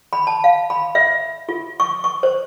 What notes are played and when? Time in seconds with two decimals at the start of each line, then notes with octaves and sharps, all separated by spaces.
0.13 B5
0.27 A5
0.44 F5
0.70 B5
0.95 E5
1.49 F4
1.80 C#6
2.04 C#6
2.23 C5